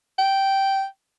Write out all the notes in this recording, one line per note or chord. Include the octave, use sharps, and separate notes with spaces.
G5